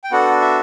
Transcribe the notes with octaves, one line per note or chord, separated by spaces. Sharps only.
G5
B3 D4 F#4 A4 F#5
E5